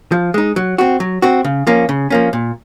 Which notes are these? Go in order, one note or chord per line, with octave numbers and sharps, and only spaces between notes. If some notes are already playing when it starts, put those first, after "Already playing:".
F3
G#3 D#4
F#3
C4 F#4
F#3
C4 F#4
C#3
F3 A#3 C#4
C#3
F3 A#3 C#4
A#2